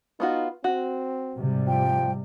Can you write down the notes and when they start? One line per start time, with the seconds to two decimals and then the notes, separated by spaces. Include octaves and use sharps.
0.20 B3 D#4 F4 F#4
0.64 C4 F#4
1.36 G#2 C3 G3
1.68 F3 G5